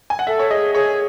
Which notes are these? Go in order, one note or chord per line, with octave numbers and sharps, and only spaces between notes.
G#5
F#5
A4 E5
C#5
G#4 D#5
G#4 C#5